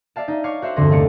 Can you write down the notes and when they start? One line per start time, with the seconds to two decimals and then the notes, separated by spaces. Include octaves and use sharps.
0.16 D5 E5 F5 A5
0.28 D#4 E5
0.44 C#5 F5 C#6 D6
0.62 F#4 C5 E5 F5
0.76 E2 G2 D3 C4 C6 A#6
0.90 D#2 C3 A3 F5 A5 C#7